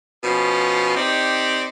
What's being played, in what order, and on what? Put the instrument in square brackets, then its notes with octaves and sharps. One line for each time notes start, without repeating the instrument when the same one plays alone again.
[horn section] B2 F3 B3 C#4
C4 D#4 G4 D5